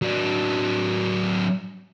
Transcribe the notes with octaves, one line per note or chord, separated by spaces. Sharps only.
F#3 D4